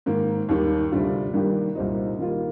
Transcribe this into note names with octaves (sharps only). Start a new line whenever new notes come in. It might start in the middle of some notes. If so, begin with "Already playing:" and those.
G#2 D#3 A#3
D#2 D#3 G3
D2 C3 G3 D4 F4
G2 D#3 A#3 D4 G4
C2 A#2 G3 C4 D#4
D#3 G3 A#3 F4